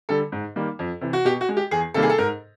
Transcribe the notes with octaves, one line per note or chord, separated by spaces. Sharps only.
D3 G3 A4
G#2
D#3 G3 A#3
F2
C3 E3
F#4
B2 G4
F#4
G#3
G4
E2 G#4
C3 D#3 G3 A#3 A4
G#4
A4
G#2 A#4